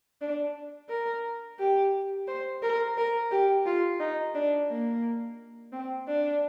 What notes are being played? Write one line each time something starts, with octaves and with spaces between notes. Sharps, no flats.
D4
A#4
G4
C5
A#4
A#4
G4
F4
D#4
D4
A#3
C4
D4